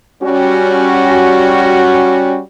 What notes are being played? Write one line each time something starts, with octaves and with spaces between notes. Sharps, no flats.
G3 C#4 F#4